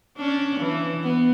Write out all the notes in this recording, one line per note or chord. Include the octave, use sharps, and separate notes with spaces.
C#4 D4
E3
B3